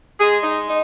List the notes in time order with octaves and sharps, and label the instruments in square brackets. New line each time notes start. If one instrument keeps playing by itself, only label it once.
[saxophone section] G#3 G#4
D#4
D#4